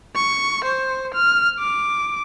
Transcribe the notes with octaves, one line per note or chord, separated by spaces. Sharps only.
C#6
C5
F6
D6